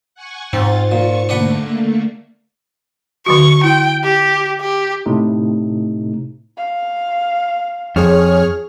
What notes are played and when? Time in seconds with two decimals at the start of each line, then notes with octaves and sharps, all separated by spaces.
0.15 F#5 G#5 C#6
0.53 G#2 C4 F4 A6
0.91 A#2 C#6 C#7
1.29 D3 A3 A#3 D4 B4 F#5
3.26 D3 F#3 F#4 C#6
3.64 E4 G5
4.04 G4
4.61 G4
5.06 A2 C3 A3 D#4
6.58 F5
7.96 F2 G#4 C#5 F6